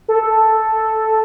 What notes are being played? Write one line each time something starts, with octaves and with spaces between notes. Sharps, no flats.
A4